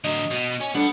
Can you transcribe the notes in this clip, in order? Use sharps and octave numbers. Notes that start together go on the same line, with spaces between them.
D3 F#3 D#5
B2
C#4
G3 B3 D4 A4